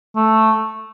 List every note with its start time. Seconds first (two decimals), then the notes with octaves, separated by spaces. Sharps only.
0.16 A3